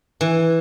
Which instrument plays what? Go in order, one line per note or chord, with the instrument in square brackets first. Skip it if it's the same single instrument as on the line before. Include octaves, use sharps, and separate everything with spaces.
[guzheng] E3